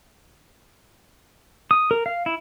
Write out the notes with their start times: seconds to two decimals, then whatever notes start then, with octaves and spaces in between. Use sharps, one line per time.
1.71 D#6
1.91 A#4
2.06 F5
2.26 E4